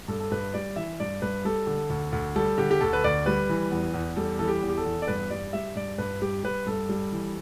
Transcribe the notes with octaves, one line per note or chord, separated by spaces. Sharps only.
G2 A4
A4
G2 B4
G3 D5
E3 E5
G2 D5
G2 B4
G3 A4
D3
D2
D2
G3 A4
D3 G4
G4
D2 A4
B4
D2 D5
G3 B4
E3
E2
E2
G3 A4
E3 A4
G4
E2
G4
A4
E2
D5
G2 B4
G3 D5
G3 E5
G2 D5
G2 B4
G3 G4
G3 B4
G2 A4
G3
E3